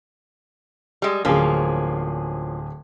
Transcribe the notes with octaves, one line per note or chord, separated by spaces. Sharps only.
G3 G#3
D1 F3 A#3 C#4 G#4